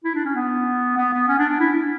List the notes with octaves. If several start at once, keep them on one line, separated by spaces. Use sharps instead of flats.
E4
D4
C#4
B3
B3
B3
C#4
D4
D4
E4